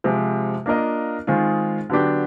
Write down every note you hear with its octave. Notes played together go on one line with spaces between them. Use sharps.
C3 F3 G#3
A#3 D4 F4 A#4 D#5
D#3 G#3 C4 F4 G#4
D3 F#3 B3 D4 G4